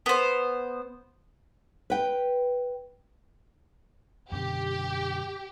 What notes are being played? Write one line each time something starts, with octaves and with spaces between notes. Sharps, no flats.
B3 C5
B4 G5
F#2 B2 D3 G4